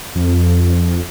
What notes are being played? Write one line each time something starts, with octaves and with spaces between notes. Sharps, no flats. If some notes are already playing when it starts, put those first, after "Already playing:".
F2